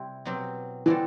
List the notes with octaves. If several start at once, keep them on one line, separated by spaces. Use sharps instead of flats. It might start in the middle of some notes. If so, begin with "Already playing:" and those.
Already playing: C3 G3 C4 E4
B2 F#3 C4 G4
B2 E3 G3 C4 F#4 A4